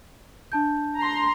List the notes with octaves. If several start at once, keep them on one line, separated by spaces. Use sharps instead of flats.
D4 A5 G6
A#5 C6